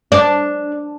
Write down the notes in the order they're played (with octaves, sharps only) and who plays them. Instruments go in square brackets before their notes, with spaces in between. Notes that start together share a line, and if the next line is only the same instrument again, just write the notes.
[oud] D4